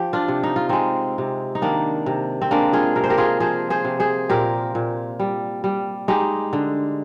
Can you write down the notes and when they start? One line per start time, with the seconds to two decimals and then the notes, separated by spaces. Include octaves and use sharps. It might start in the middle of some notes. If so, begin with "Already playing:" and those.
Already playing: F3 G4
0.13 D4 F4
0.28 C3
0.43 D#4
0.56 F4
0.69 G#3 C4 D#4
1.18 C3
1.55 D#4
1.62 D#3 A#3 D4
2.06 C3
2.42 C4
2.51 G#3 A#3 D4
2.73 F4 G#4
2.95 C3 A#4
3.04 C5
3.10 G4 A#4
3.18 F4 G#4
3.40 F3 G#4 C5
3.70 G#4 C5
3.85 C3
4.00 G#4 C5
4.29 A#2 G4 A#4
4.75 A#2
5.19 G3
5.64 G3
6.08 G#3 D#4 G4
6.53 D3